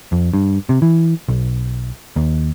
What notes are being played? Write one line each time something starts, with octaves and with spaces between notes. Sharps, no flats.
F2
G2
C3
E3
B1
D#2